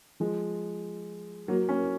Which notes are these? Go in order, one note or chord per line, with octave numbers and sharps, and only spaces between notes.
F3 G#3
F#3 A#3
A#3 C#4